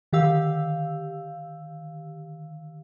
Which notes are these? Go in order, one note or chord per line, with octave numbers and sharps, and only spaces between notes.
D3 D#3 G4 F5 E6